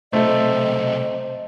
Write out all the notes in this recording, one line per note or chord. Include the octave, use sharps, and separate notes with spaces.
B1 C3 A3 C5 D#5